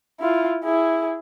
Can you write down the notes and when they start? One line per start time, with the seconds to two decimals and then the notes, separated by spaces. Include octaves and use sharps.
0.20 E4 F4
0.64 E4 G#4